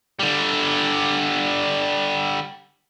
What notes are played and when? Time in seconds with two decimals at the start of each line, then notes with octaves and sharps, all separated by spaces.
0.19 D3 G3